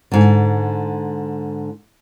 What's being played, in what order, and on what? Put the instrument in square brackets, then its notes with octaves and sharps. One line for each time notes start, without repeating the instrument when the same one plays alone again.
[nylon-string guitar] G#2 D3